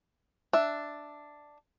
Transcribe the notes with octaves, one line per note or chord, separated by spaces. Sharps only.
D4 E5